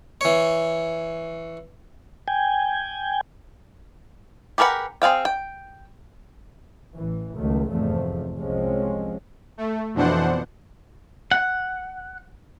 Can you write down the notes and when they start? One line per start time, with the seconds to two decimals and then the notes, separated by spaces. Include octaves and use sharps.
0.21 E3 C#5
2.28 G5 G#5
4.58 G4 G#4 A#4 B4 F#5
5.02 C4 G#4 F5 G5
5.25 G5
6.94 A1 E3
7.37 C#2 D#3 F#3 A3
7.70 F1 E2 G#2 C3 F3 A3
8.38 C2 F3 G#3 C4 C#4
9.58 A3
9.94 F2 B2 E3 D4 C5 F#5
11.32 F#5